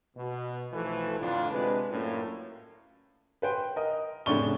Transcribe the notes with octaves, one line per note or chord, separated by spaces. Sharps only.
B2
B1 E3 F3 A3 A4 B4
F2 A2 D3 D4 F4
C3 G#3 D4 B4
F#2 A2 A#3 C#4 D4 F4
B4 C5 G5
A#4 D#5
F2 A2 C#3 D4 C#6 G7